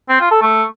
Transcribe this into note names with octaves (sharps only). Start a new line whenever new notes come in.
C4
F4
A4
A3